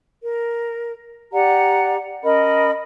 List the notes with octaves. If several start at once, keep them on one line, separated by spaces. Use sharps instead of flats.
A#4
G4 D5 F#5 A#5
C#4 A#4 D#5 B5